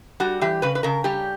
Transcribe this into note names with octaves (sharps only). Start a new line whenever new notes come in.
G3 F#4
E3 G4
C#3 B4
B4
C#3 A#4
G3 G4